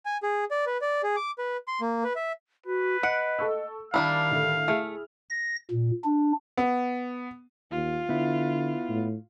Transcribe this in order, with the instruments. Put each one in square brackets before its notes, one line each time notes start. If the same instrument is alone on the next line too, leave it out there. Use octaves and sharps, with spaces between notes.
[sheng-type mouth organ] G#5
G#4
D5
B4
D5
G#4
D6
B4
C6
A#3
B4
E5
[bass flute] F#4 [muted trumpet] B4
[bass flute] D#5 [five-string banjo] F#5 [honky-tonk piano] D7
[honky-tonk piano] A4 C#6 E6
[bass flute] D#3 [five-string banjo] G3 D4 E4 [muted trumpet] F5 [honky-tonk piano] A5 A#5
[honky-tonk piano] A2 D3 A3
[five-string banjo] A3 [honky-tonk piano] E4 G#4 F6
[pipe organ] A#6
A#2
D4
[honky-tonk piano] B3
[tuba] D#2 [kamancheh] F4
[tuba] D3 [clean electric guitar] B3 E4
[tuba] A2